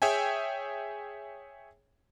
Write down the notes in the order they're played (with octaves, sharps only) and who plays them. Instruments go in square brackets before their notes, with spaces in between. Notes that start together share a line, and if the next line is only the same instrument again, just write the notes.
[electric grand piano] G#4 C#5 E5 G5 G#5